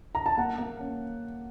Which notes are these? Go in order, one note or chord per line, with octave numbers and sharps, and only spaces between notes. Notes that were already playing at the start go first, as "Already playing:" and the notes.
A#5
A5
A#3 F#5
A#3
C#4